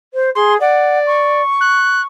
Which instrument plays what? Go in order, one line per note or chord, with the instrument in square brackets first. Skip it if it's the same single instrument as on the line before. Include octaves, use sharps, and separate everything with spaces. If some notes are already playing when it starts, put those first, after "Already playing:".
[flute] C5
[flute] G#4 [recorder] C6
[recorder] D5 [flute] F#5
[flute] C#6
[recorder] F#6